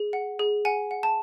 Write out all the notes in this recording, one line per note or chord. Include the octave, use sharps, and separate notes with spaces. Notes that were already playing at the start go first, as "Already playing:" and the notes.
Already playing: G#4
F#5
G#4
F#5 G#5
F#5
A5